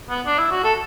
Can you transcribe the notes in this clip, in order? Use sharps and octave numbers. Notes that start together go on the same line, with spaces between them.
B3
D4
E4
F#4
A4